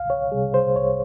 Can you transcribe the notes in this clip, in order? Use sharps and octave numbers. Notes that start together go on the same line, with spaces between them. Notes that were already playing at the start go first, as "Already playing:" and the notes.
Already playing: C2 F5
C#5
C3 G3 G#4
C5
C2 C#5